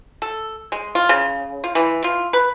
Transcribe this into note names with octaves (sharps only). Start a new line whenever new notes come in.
A4
G#3
F4
C#3
F4
E3
F4
B4